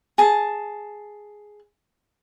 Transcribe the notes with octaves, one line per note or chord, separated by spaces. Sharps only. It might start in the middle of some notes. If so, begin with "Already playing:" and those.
G#4 A5